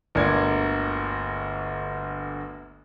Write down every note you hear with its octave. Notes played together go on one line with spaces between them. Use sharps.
G1 D2 A#3 D5 G#6